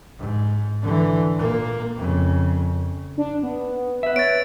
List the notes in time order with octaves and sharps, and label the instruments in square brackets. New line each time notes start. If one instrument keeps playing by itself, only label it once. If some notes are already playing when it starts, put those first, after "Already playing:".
[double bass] G#2
D3 E3
A#2 A#3
F2 C#3
[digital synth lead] D4
B3
[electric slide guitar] B4 E5
[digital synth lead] C#5 [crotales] A6 D7